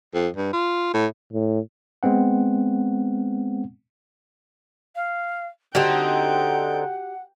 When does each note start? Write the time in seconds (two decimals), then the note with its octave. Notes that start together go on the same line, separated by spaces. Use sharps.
0.15 F2
0.37 G2
0.53 F4
0.94 A2
1.33 A2
2.03 G#3 B3 C4 F#5
4.96 F5
5.75 D3 C4 D#4 F#4 G4 F#5 G5